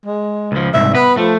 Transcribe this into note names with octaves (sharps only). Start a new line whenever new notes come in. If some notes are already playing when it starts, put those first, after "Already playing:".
G#3
C#2 F3
C2 G#2 E5
B3 B4
F3 A3